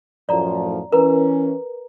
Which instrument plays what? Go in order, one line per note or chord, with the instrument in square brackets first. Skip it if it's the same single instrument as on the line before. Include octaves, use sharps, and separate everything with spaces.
[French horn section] F#2 A2 F3 [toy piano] D5 A#5
[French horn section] E3 C#4 [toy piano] A#4 B4 A#5